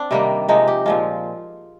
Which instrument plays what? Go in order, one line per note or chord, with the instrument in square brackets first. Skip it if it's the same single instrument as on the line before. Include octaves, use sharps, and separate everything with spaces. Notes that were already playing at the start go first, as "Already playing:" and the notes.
Already playing: [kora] C4 D4
C3 D#3 G3 A#3
C3 F3 G#3 D#4
G4
A#2 F3 G#3 F4